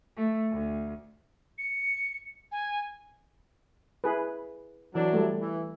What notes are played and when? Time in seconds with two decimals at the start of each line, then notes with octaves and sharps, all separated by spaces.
0.17 A3
0.52 D2
1.58 C#7
2.52 G#5
4.04 E4 G#4 B4
4.95 E3 F#3 D4
5.13 G3 A3
5.41 E3